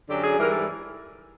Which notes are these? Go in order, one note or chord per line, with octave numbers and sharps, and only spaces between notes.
F#2 D3 F#3 G4
G#4
G#2 E3 G3 A#4
A4